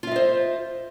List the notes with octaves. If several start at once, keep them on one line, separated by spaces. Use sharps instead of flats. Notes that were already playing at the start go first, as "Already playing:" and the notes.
F4 C5 D#5 E5